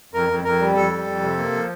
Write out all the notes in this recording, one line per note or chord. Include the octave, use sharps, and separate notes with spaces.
F2 A#4
F2
F2 A#4
G3
F2 A4
G3
F2
C3
A#3
F3